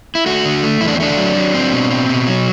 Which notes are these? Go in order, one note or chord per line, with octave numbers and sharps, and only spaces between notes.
E4
A3 F#4
D3
A3
E2 E4
D4
C4
A3 D4
F#3
F#3
C4
B2
C4
B2
F#3